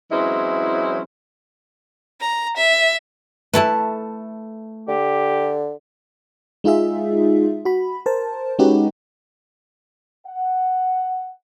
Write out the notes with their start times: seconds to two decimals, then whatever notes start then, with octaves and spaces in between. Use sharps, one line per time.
0.12 E3 F#3 G#3 C4 C#4 E4
2.21 A#5
2.57 E5
3.53 A3 E4 A4 B4 G#5 A5
4.88 D3 G4
6.64 G#3 D#4 F4 G#4 E5
7.65 F#4 B5
8.06 A#4 C5 A5
8.59 G#3 C#4 D#4 F#4 G4 B4
10.27 F#5